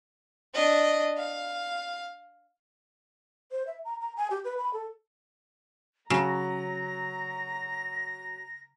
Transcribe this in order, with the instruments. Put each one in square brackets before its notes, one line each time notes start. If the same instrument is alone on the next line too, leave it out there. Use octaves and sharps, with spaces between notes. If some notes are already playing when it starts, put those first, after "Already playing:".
[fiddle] D4 D#5
F5
[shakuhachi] C5
E5
A#5
A#5
G#5
G4
B4
B5
A4
[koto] C#3 [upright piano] F#3 [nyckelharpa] A#5 [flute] A#6